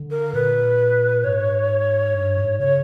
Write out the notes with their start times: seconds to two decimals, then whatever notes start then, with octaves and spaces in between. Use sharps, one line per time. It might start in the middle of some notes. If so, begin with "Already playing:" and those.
Already playing: D3
0.11 A#4
0.34 A#2 B4
1.24 G#2 C#5
2.15 G2
2.37 G#2
2.59 C#3 C#5